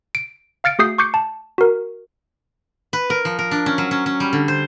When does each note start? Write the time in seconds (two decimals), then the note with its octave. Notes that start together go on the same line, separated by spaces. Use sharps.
0.15 D7
0.64 F5 F6 A6 C#7 D7
0.79 A3 F#4 G#4 D#6 G6 C7
0.98 C#6 D6 G6 C7 C#7
1.14 A5
1.58 F#4 A#4
2.93 B4
3.10 A#4
3.25 F3
3.39 A#4
3.51 D4
3.66 C#4
3.78 F#3
3.91 C#4
4.06 C#4
4.20 G3
4.33 D3
4.48 C5